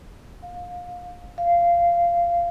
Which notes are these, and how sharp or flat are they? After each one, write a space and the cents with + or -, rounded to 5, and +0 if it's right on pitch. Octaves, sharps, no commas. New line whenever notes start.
F5 +30
F5 -15